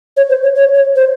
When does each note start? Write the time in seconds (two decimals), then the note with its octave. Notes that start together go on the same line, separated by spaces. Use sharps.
0.17 C#5
0.30 C5
0.43 C#5
0.56 C#5
0.74 C#5
0.96 C5